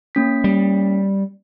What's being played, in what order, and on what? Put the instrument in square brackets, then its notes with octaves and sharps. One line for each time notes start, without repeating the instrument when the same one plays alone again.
[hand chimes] A#3 C#4 B6
[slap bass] G3